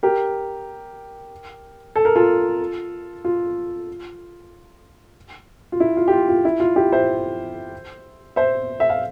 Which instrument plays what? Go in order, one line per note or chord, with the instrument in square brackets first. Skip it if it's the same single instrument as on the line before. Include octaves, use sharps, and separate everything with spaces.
[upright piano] G4 A#4
A4
A#4
F4 A4
F4
F4
E4
F4
G4
F4
F4
E4
F4
E4 G4
C5 E5
C5 E5
E5
F5